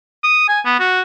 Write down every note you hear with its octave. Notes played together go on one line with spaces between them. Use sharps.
D#6
G#5
B3
F#4